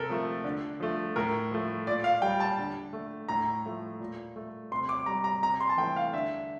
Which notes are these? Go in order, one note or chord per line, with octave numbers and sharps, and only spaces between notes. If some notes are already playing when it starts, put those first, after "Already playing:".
Already playing: C3 A4 A#4
F3 A3
D3
F3 A3
A2 A#4
F3 A3
A#2 D5
F5
G3 G5
A5
D3
A3
A2 A#5
F3 A3
A#2
A3
C3 C6
D6
G3 A#5
A#5
C3 A#5
C6
A5
E3 A3 G5
F5
D3 E5